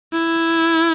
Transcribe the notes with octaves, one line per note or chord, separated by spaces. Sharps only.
E4